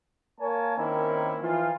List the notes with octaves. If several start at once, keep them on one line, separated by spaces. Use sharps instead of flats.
A#3 A#4 C#5 G#5 A5
D#3 A#3 C4 C#4 E4
E3 F3 F4